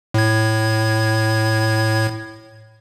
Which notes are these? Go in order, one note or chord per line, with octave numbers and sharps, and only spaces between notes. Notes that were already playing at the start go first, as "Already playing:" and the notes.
A2 G#6